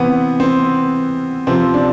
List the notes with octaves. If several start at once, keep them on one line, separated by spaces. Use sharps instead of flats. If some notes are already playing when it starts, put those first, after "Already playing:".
Already playing: C3 E3 B3 C4
C4
C3 F3 C4
D4